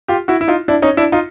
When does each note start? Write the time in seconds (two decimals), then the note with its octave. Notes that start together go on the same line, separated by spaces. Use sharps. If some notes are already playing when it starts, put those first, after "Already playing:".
0.08 F4 G4
0.28 E4 F#4
0.41 E4
0.48 D#4 F4
0.68 D4 E4
0.82 C#4 D#4
0.97 D4 E4
1.12 D#4 F4